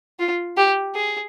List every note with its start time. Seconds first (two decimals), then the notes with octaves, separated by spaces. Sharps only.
0.19 F4
0.57 G4
0.95 G#4